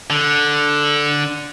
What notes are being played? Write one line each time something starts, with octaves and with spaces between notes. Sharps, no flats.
D3